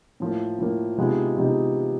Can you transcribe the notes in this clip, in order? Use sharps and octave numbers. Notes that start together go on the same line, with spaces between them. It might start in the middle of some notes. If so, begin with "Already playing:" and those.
A2 F3 A#3
A2 F3 A#3
C3 F3 G#3 B3 D#4
C3 F3 G#3 B3 D#4